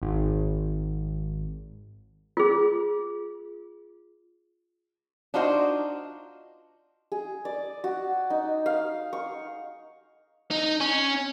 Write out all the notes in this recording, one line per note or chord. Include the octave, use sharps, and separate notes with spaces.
G#1
F4 G#4
D4 D#4 F4 F#4 C5 D#5
G#4
D5
F#4
D#4
F5
C#6
D#4
C#4